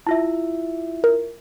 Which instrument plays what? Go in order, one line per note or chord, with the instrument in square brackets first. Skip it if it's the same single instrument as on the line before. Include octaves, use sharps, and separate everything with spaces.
[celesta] E4 F4 E5 [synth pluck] A5
[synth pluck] A#4